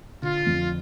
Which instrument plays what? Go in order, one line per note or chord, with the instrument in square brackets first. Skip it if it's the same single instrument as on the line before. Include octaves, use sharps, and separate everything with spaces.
[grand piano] D3 [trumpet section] F4
[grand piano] F2